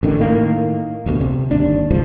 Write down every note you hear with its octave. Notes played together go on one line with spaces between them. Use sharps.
A1 D3 D#3
A2 D#3 A#3
D1 D2 G#2 B2
C3
G1 D#2 D4
G#1 C#2 G#2 F3